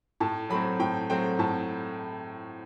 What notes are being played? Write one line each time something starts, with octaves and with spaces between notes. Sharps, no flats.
A2 A5
F#3 A3 C4 B5
A2 G5
F#3 A3 C4 G5
A2 A5